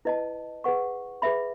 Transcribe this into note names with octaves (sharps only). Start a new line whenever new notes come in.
E4 B4 D#5 A5
G#4 B4 F#5 C#6
G#4 B4 E5 B5